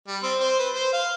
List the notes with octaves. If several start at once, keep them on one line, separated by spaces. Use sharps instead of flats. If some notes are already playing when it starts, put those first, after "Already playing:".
G3
C4 C6
C5
B4
C5
F5